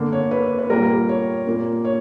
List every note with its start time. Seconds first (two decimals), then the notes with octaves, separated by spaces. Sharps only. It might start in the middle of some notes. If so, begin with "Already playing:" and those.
Already playing: D3 A#3
0.12 C#5
0.31 B4
0.59 B4
0.70 A#2 G3 A#3 A#4
1.09 C#5
1.47 A#2 A#3
1.85 C#5